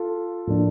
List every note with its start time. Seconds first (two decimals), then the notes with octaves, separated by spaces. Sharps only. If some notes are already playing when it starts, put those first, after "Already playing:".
Already playing: F4 A4
0.47 A2 F3 A#3 D4